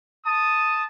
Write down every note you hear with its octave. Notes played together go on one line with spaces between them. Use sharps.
A5 D#6